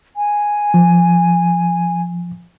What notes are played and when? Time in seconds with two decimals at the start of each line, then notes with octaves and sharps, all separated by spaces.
0.16 G#5
0.74 F3